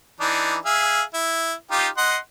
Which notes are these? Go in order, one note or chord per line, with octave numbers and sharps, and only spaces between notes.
E3 D4 D#4
G#4 E5 F5
E4
D#4 F4 G4
D#5 F#5 C6